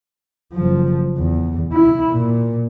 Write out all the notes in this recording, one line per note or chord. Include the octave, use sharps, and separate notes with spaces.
F#1 F3
E2
E4
A#2